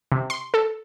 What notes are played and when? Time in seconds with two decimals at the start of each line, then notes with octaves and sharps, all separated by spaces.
0.12 C3
0.30 C6
0.54 A4